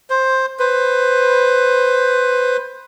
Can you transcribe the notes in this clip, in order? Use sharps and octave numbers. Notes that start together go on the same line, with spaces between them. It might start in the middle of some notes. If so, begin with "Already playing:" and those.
C5
B4 C5